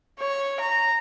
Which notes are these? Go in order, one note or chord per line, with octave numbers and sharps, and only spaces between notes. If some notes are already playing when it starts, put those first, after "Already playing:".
C#5
A#5